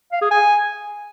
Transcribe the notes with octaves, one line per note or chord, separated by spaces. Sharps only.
F5
G#4
G#5